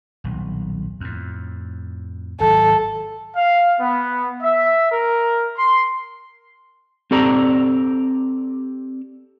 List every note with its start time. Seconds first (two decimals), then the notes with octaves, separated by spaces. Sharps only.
0.24 D#1 B1
1.00 F2 A2
2.41 G#1 F#3 A4
3.36 F5
3.79 B3
4.41 E5
4.91 A#4
5.57 C6
7.11 C4 G4 A4 D5 A#5